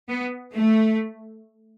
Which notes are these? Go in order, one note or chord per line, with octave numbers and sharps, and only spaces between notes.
B3
A3